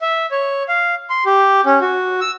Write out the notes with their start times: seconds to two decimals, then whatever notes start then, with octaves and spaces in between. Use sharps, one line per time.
0.01 E5
0.31 C#5
0.68 F5
1.10 C6
1.26 G4
1.66 C#4
1.81 F#4
2.21 E6